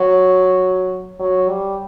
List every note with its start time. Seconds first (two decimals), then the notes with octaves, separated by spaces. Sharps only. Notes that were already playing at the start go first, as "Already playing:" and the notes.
Already playing: F#3
1.20 F#3
1.49 G3